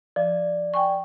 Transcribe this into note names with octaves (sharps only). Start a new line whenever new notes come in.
F3 D5
G5 G#5 C#6